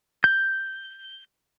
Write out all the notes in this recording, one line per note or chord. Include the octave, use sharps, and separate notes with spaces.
G6